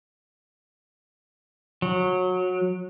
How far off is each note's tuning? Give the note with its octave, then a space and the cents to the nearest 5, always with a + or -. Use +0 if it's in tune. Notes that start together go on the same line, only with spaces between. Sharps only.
F#3 -20